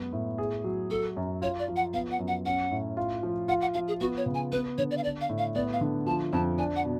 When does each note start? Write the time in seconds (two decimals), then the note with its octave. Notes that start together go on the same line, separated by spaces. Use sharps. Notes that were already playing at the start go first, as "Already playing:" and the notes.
Already playing: F#2 G#3 B3
0.13 A2
0.38 G#4
0.64 F#3
0.90 F#3 A4
1.16 F#2
1.42 F4 C#5
1.59 D5
1.68 F3
1.76 F#5
1.94 B3 F5
2.11 F#5
2.19 F#2
2.28 F#5
2.45 C#4 F#5
2.71 A2
2.97 F4
3.23 F3
3.48 F4 F#5
3.61 F#5
3.74 F3 F5
3.88 G#4
4.00 B3 F#4
4.17 C#5
4.26 C#3
4.35 G#5
4.52 B3 B4
4.78 D3 C#5
4.91 D5
4.98 F5
5.04 D4 D5
5.21 F5
5.29 A2
5.38 F5
5.55 B3 D5
5.73 F5
5.81 D3
6.07 F3 A5
6.33 F2 A5
6.58 D4 G#5
6.76 F#5
6.84 B2